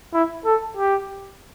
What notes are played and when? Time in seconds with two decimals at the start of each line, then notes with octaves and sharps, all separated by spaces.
0.13 E4
0.45 A4
0.77 G4